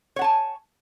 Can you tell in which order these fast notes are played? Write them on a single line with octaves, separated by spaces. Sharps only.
C#5 F#5 A5 G#5